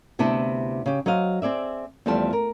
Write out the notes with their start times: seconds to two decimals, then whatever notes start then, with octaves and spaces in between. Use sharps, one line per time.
0.19 D2 C3 B3 D4 E4 A5
0.86 C#3 G4
1.06 F#3 C5 D#5 F5
1.42 C4 G#4 D5 E5
2.06 E2 F3 G3 A3 C4 A5
2.33 A#4